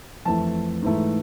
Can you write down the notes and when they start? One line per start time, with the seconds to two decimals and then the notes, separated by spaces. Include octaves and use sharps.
0.25 F2 E3 A3 A5
0.82 G#2 E3 A3